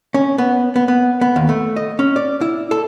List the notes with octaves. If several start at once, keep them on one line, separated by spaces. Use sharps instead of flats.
C#4
B3
B3
B3
B3
D#2
A3
D#5
C#4
D5
E4
A4